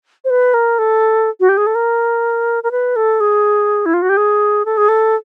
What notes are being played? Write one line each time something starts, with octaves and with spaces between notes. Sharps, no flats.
C5
B4
A#4
A4
F#4
G4
G#4
A4
A#4
A#4
B4
A4
G#4
E4
F4
F#4
G4
G#4
A4
G#4
A4